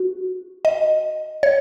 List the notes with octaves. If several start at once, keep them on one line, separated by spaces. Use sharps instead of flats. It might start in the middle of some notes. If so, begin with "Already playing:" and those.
Already playing: F#4
D#5
C#5